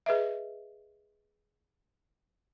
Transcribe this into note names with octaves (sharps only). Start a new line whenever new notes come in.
G#4 B4 D#5 E5